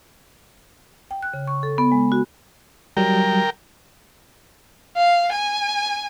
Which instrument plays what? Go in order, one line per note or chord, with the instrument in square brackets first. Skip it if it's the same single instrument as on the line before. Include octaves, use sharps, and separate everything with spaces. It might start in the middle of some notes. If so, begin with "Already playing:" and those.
[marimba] G5
F#6
C#3
C#6
A4
B3
G#3
F#4
[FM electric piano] F#3 G3 [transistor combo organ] A#4 G5
[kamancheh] F5
G#5